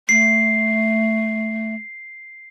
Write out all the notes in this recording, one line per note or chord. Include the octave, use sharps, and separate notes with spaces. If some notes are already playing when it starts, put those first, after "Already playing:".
A3 C7